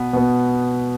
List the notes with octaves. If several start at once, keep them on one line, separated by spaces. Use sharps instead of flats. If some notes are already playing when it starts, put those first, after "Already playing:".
Already playing: B2 B3
B2 B3